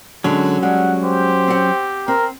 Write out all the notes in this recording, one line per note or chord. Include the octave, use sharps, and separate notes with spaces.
D3 F#3 G#3 C#4
G3 G#3 F#5
G4 C5
C4 F#5
C4 A#4